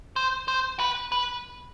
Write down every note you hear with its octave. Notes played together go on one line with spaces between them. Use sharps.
C5
C5
B4
B4